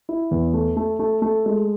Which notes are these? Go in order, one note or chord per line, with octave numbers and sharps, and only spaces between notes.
E4
E2
A3
A3
A3
A3
G#3